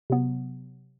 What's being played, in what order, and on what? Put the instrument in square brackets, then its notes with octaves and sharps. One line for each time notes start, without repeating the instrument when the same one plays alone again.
[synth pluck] C3 F#3 B3